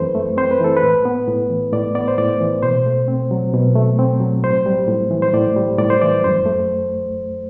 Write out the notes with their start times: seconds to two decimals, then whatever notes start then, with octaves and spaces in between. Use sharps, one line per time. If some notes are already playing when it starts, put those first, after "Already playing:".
Already playing: F#2 E3 A3 C4 A4 B4 C5
0.15 A3
0.37 C4 C5
0.51 B4
0.60 E3 A4
0.77 B4
0.83 A2
1.05 B3
1.28 A2
1.50 E3
1.73 A2 D5
1.95 B3 D5
2.08 C5
2.18 A2 D5
2.41 E3
2.63 B2 C5
2.86 A3
3.08 C4
3.31 F#3
3.54 B2
3.75 A3
3.99 C4
4.20 F#3
4.43 A2 C5
4.66 G3
4.88 A2
5.11 E3
5.22 C5
5.33 A2 D5
5.56 G3
5.78 A2 D5
5.90 C5
6.01 E3 D5
6.24 F#2 C5
6.46 A3